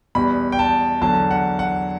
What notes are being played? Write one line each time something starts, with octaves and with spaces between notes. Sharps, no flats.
E2 B2 G3 B5
G5
A5
E2 D3 F#3 A5
F#5
F#5